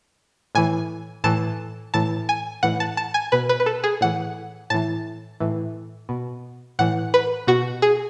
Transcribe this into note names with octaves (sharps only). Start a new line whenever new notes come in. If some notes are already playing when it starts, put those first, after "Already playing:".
A2 E3 G#5
A2 E3 A5
A2 E3 A5
G#5
A2 E3 F#5
A5
A5
G#5
B2 B4
B4
B4
A4
G#4
A2 E3 F#5
A2 E3 A5
A2 E3
B2
A2 E3 F#5
B4
B2 F#4
G#4